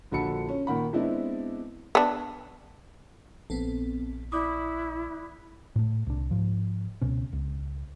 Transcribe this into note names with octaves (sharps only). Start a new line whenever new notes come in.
A#1 D3 F#4 A4 B5 C#7
C#4
A#2 D#3 F#5 B5
G#3 B3 C4 D4 E4 D#5
B3 D4
A#1 B3 C4 A4
E4 D5 B5 D6 D#6 F#6 B6
A2 A3
C2 D4
G#2 F3
C#2 B2 C#4
C#2